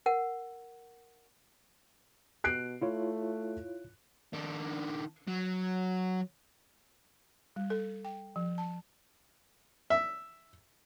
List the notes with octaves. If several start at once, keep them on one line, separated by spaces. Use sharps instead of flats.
A#4 F#5
B2 F#6 C7 D7
A3 E4 F4 C#5
D#3 D4
F#3
G3
A4
G5
F3
A5
E5